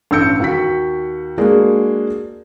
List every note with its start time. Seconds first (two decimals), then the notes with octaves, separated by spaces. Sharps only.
0.11 A1 G2 E6 G6 C#7
0.40 D#2 F#4 B6
1.38 G#3 A#3 D4 F#4 G#4